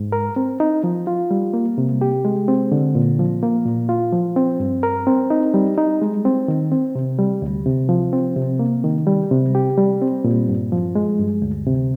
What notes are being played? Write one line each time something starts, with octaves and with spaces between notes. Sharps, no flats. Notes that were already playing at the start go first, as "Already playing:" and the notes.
Already playing: G#2
A#4
C4
D#4
F3
F4
G3
A#3
C3
G4
G#3
C4
D3
A#2
F3
A#3
A#2
F4
F3
C4
G2
A#4
C4
D#4
G3
D#4
G#3
C4
D#3
C4
C3
G3
D2
C3
F3
C4
C3
A#3
D#3
G3
C3
G4
G3
C4
A#2
G2
F3
G#3
G2
D2
C3